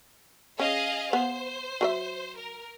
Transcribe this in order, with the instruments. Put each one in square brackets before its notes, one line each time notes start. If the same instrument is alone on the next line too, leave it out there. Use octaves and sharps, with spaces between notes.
[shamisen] C#4 [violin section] G#4 D#5 F5
[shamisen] B3 [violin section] C5
[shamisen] F#3 B4 E5
[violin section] A#4